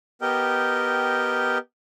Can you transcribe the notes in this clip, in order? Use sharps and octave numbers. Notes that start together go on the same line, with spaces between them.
B3 G4 A#4 D#5 G5